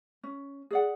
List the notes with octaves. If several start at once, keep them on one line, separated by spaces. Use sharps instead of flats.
C#4
G#4 D5 F#5